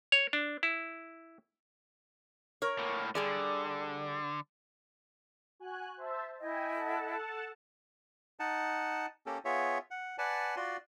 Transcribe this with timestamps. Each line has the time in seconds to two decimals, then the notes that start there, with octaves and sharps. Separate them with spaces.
0.12 C#5
0.33 D4
0.63 E4
2.62 A#4 C#5
2.78 A2 A#3
3.15 D3 G3 G#4 D5
5.60 F#4 G#5 F#6
5.97 C5 E5 A5
6.40 E4 D#5 G5 G#5
6.75 A4 F#5 A5
8.40 D#4 F#5 A5
9.26 A#3 C#4 G4 A4
9.45 B3 F4 G#4 C#5 E5
9.91 F#5
10.18 B4 D5 F#5 G#5 A5
10.56 F4 F#4 D5 C6